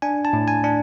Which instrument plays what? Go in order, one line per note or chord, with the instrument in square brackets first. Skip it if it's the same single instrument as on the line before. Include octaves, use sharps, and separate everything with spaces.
[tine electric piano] D4 G#5
A5
A2
G#5
D4